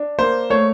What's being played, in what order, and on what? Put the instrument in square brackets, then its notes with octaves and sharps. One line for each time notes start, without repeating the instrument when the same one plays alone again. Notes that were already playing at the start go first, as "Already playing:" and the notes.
Already playing: [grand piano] D4
A#3 C5
A3 C#5